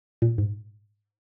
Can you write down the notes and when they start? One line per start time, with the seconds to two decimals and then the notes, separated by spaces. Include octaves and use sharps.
0.22 A#2
0.38 G#2